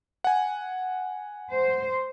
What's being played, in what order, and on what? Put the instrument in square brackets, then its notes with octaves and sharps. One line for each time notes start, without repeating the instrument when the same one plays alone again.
[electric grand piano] F#5 G#5
[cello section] C5